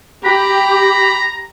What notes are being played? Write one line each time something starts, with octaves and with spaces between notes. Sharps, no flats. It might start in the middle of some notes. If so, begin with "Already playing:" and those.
G4 A#5 B5